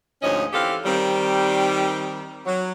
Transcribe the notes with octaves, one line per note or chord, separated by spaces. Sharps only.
D2 G#2 F3 C#4 C#5 D#5
E3 C4 G4 A4 F5
D#3 G3 C4
F#3